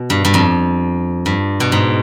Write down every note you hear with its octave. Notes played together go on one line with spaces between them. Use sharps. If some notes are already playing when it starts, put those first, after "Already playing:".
Already playing: B2
G2
G2
F2
G2
B2
G#2